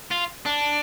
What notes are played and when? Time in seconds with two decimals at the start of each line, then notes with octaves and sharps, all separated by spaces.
0.11 F4
0.46 D4